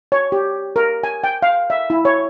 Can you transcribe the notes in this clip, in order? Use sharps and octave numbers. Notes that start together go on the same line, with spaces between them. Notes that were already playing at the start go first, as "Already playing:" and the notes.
C#5
G4
A#4
G#5
G5
F5
E5
E4
C#5